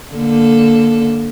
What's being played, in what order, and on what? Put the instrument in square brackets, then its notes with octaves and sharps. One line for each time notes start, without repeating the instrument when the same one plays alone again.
[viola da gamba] D3 A#3 A4